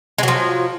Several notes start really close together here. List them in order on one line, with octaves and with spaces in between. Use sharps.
G#3 F#3 F3